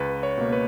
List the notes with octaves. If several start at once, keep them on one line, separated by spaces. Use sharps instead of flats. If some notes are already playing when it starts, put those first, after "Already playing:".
Already playing: C#2 B4
C#5
B2 A#3
B4